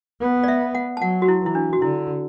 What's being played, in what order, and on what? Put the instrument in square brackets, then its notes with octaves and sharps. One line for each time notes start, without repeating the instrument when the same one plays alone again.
[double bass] B3
[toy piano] D5
E5
F#5
A5
[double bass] F#3 [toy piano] F#5
[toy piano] F#4
E4
[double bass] E3 [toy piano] E4
[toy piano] D4
F#4
[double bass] D3 [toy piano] E4